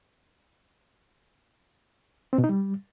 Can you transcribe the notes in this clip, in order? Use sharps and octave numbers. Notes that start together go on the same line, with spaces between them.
C4
B2
D#4
G3